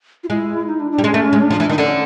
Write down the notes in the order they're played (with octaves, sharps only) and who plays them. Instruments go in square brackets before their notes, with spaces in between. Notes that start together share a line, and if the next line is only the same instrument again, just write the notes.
[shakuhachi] F4
[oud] G#3 [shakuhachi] E4
[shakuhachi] D#4
D4
D4
[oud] G3
[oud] G#3 [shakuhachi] C#4
[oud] A3
G#3
[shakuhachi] D4
[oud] F3
E3
D#3
[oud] D3 [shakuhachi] C#4